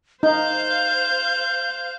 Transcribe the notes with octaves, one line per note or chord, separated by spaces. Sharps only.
D#4 C5 F5 G6